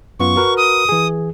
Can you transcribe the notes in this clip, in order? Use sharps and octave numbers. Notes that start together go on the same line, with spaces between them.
F#2 B3 F4 C#6
F#4 A#4 B4
D#6
E3 G#4